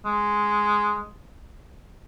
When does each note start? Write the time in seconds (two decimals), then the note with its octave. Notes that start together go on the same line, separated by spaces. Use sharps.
0.05 G#3